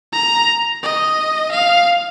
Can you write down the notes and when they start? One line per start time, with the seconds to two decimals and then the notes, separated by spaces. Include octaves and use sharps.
0.13 A#5
0.82 D#5
1.51 F5